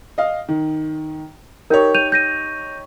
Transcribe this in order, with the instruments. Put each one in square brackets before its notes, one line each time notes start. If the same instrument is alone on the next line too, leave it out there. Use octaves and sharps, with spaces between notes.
[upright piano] D#5 F5
D#3
[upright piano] D#4 G4 C#5 [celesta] A#4 G6
[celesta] G6 D#7 F7
G6 A#6 D#7